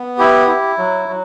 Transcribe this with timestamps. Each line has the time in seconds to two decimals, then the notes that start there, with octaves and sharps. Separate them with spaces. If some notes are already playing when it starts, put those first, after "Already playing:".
Already playing: B3
0.18 E4 G4
0.48 E4
0.78 F#3
1.09 F#3